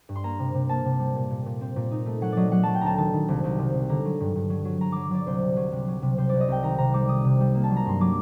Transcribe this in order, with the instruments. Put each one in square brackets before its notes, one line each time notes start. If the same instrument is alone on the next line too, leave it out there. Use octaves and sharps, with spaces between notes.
[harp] G2
C6
A#3 A#5
C3
C3
A#3 A5
C3
G3
A#2
A#2
A#2
C4
A#2
D#4
A3
F#3 F#5
F#3 D5 D#5
F#3 F#5
F#3 A5
G5
D2 A5 A#5
D#3 A5
D#3
C2
C2
C3
C3
D3 A#5
F#3
G2
G2
F#3
F#3
F#3 A#5
F#3 D6
F#3 D5
C2 C5
C3
F#3
C3
F#3
C3
C3 C5
C2 D5
D#5
C2 G5
D#3 A#5
C3 A#5
G3 D6
D#3 D#6
C3
G3
A#3
A5
F#3
A#5
G2 C6
F#3 D6